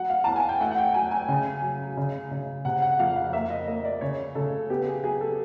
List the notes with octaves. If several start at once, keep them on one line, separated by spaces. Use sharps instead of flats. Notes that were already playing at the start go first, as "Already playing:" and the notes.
Already playing: F#3 F#5
F5
E2 A5
G#5
G5
A3 F#5
F#5
G5
F#3 G#5
G#5
C#3
F#2
C#3
C#3
C3 F#5
F#5
F2 F5
F5
A#3 E5
D#5
A#3 D#5
D5
C#3 C#5
C#3 A4
B3 G4
G#4
F#3 G#4
A4